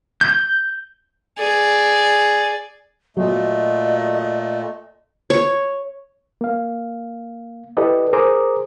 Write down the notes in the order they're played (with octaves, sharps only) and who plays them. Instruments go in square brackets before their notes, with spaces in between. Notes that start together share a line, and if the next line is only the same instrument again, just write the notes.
[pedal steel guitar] G6
[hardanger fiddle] G#4 D5
[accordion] A#2 A3 [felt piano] F#3 [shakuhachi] D#5
[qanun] C#5
[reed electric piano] A#3 F5
E4 G4 A4 B4 D5 D#5
G#4 A#4 C5 A#5 D6 D#6